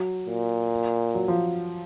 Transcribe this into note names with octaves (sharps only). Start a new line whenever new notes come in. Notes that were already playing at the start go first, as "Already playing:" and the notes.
Already playing: F#3
A#2
F#3
F3